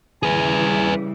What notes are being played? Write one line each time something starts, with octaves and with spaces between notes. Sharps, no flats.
C#3 E3 G3 G#4 B4 G#5